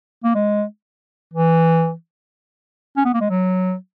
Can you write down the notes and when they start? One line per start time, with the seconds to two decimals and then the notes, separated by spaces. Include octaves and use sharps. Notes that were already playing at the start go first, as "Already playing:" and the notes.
0.24 A#3
0.35 G#3
1.34 E3
2.97 C#4
3.05 B3
3.14 A#3
3.21 G#3
3.30 F#3